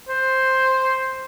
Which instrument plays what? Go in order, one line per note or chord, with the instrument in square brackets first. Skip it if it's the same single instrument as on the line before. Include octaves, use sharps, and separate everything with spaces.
[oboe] C5